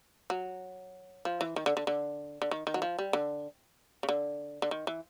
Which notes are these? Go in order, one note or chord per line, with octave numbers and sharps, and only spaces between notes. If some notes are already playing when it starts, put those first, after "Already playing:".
F#3
F3
E3
D#3
D3
D3
D3
D3
D#3
D#3
F#3
F3
G3
D3
C#3
D3
D3
D#3
E3